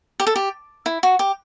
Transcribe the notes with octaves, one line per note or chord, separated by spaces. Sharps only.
G4
A4
G4
E4
F#4
G4